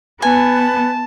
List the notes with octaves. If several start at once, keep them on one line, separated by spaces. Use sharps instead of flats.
B3 B4 G#5 A5